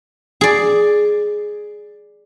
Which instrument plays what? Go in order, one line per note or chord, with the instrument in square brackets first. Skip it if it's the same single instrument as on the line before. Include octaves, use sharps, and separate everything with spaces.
[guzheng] G#4 D5